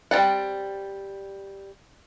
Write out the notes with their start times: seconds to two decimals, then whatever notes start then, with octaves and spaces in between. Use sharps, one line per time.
0.11 G3 C4 D#4 D5 F#5